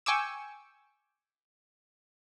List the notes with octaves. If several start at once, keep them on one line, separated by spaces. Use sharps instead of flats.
G5 G#5 C#6 D6 E6